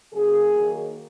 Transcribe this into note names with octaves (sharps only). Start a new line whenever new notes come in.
C#3 F#3 A#3 G#4
D#3 F#3 A#3